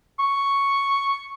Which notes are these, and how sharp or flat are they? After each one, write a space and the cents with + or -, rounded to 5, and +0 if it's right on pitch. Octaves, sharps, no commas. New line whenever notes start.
C#6 +0